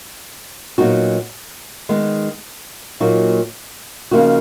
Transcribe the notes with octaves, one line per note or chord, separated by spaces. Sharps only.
A#2 F#3 B3 D#4 F#4
D#3 G#3 B3 D#4
A#2 F#3 A#3 D#4 F#4
C#3 F3 A#3 D#4 F#4